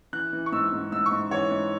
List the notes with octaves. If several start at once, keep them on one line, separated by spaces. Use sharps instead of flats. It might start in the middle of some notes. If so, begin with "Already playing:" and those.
E3 F#6
E3
C#6
G#2 E6
G#2
G#2 E6
C#6
G#2
E3 C#5
G#2